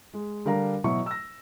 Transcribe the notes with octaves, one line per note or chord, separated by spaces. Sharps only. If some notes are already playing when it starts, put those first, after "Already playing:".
G#3
D3 G3 D4 A#4 F5 A#5
B2 E3 F#3 E5 C#6
E6 A#6